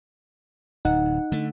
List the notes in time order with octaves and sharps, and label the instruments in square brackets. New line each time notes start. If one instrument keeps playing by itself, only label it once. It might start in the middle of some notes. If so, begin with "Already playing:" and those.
[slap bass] D1 [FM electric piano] D#4 F#5
[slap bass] D3 A3